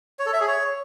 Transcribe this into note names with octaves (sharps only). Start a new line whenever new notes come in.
C#5
A4
E5
G#4
C#5